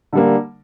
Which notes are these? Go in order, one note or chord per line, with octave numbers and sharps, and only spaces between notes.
D3 G3 A#3